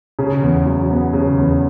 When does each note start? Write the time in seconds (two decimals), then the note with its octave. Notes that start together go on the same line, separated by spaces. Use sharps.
0.19 C#3
0.42 E2
0.66 F#3
0.90 B3
1.13 C#3
1.37 E2